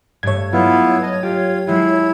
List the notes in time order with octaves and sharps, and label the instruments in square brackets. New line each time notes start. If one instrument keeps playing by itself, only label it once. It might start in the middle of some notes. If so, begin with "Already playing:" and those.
[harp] G2 A3 [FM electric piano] C#5 G#6
[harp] F#3 [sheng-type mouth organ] B3 E4 F4
[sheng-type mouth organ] D#5 [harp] A5
[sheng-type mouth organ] F4 [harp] G4
[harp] F#3 G#3 F4 [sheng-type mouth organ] E4